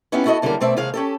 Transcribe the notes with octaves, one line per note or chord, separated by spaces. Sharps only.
B3 C#4 D#4 E4 G4
E4 F#4 A4 D#5
F#2 D3 G3 A#3 G#4 A#4
B2 A3 C4 D5 E5
D#2 C3 G#3 G#4 F5
C#4 G4 A4